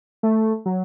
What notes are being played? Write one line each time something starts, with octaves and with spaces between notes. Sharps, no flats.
A3
F#3